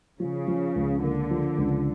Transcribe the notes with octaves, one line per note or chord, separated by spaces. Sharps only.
C#3 F3
F3
C#2
D3 A#3
F3
C#2